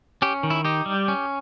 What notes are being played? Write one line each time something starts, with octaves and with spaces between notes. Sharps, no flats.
C#4 G4
D#3
E4
D#4 G4
G3
C#4